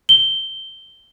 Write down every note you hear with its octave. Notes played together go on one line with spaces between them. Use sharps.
G7